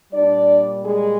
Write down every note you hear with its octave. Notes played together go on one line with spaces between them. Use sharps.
A#2 G3 D4 D5
G#3 G#4